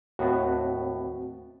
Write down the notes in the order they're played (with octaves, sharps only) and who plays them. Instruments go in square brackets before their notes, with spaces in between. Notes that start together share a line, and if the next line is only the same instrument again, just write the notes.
[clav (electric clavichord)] D#2 A2 B3 [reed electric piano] C4 F#4